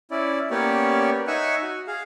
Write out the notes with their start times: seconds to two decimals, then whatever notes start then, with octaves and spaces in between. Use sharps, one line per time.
0.11 C#4 E4 D5
0.50 A#3 B3 C#4 G4 C#5 D5
1.27 D#4 C#5 E5 F#5 G#5 C#6
1.63 F#4
1.87 G#4 F5